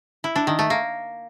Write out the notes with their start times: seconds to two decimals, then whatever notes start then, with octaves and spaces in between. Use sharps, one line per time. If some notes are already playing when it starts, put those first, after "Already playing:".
0.24 E4
0.36 D4
0.47 D#3
0.59 A3
0.70 A#3